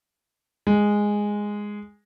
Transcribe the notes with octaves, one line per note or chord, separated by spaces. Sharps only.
G#3